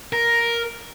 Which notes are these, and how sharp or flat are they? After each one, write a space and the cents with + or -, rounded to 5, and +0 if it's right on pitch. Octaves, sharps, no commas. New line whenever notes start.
A#4 +5